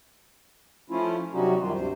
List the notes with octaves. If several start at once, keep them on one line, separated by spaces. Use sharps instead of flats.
F3 A3 C#4 E4 F4
C3 F#3 G3 C#4 D#4 F#4
F#2 D#3 E3 G3 F4
D2 G2 C3 C5